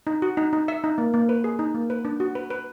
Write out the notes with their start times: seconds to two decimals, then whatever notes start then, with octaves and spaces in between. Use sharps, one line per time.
0.07 D#4
0.22 F#4
0.37 D#4
0.53 D#4
0.68 E5
0.84 D#4
0.98 A#3
1.14 A#3
1.29 B4
1.44 G#4
1.59 D#4
1.75 A#3
1.90 B4
2.05 D4
2.20 F#4
2.35 B4
2.50 B4